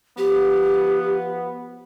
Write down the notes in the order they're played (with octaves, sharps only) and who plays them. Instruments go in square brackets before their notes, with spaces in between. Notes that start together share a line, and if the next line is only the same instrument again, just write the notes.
[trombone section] F3 B3 [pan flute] G4